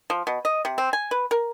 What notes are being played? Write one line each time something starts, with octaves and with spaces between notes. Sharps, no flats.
F3
B2
D#5
C3
C4
G#5
B4
A#4